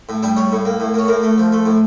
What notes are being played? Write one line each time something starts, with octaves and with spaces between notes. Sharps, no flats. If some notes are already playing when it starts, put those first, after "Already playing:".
A2
G3 D4
G3 C#5
A2
A#3
A2
A#3 C#5
A2 A#4
A3
F3
A3
A2